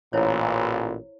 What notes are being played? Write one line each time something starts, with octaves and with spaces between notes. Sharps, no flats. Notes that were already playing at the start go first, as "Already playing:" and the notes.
A1 A#2 E4 C5 C#5